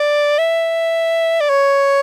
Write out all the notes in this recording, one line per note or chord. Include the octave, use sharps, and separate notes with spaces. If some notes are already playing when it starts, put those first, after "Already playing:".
Already playing: D5
E5
D5
C#5